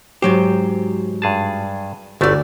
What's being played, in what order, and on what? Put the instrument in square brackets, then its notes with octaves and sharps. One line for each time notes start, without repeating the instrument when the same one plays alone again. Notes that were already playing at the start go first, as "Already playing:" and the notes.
[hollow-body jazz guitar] G#2 F#3 G4 [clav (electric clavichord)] C5 G5
[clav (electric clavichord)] G2 G#4 A5
[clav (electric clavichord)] G1 A3 [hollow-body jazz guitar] D2 D5